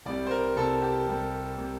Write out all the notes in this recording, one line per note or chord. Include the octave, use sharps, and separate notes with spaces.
C2 C3 G3 D5
C5
A#4
C2 C3 G3 A4
G4
C2 C3 G3
C3 G3